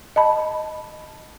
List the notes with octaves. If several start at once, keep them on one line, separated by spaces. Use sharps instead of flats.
D#5 A5 B5